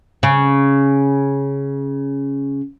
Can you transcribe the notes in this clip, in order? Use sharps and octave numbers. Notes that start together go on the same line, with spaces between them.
C#3